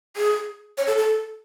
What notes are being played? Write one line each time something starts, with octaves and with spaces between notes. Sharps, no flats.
G#4
C#5
A4
A4